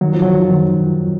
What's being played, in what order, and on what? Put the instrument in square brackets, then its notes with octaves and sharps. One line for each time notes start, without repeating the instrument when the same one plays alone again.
[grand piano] D#3 [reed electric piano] F#3
[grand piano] F3
[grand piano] D#3 [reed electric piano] F#3
[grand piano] F3
[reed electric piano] F4
[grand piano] D#3